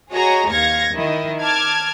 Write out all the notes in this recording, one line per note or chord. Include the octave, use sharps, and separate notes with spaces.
F#4 G#4 C#5 D#5 A#5
D#2 F5 G#6 A#6 C#7
D#3 E4 D#5
A5 D6 F6 G#6